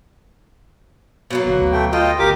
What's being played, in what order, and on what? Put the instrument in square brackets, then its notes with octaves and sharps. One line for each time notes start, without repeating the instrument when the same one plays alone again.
[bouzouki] B2 F#3 A#3
[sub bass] G1
D2
[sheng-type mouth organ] A3 G5
[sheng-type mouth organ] F4 D#5 G5 [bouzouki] A4
[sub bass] G1 [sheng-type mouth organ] G4 A#4 D6